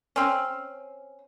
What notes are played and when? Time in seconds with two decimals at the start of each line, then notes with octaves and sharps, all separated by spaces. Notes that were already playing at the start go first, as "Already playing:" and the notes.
0.16 C4 C#4